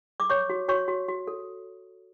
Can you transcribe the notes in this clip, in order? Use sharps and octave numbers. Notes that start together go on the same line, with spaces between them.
D6
C#5 C#6
F#4
F#4 C#5 C#6
F#4
F#4
A4